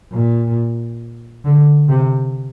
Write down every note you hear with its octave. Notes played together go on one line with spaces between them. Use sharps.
A#2
D3
C3